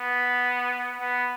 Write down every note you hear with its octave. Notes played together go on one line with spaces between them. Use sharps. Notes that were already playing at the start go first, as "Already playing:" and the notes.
Already playing: B3
B3